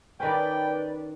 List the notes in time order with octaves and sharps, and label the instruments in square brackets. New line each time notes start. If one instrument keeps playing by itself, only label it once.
[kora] D#3 C#4 [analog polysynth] B4 D5 [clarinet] G5